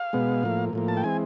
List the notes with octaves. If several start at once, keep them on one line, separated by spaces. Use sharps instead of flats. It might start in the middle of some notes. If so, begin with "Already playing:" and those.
Already playing: F5
B2 G#3 B3
A2 F3 A#3
A2 F3 A#3
A5
G5
E3 G#3 C4 G#5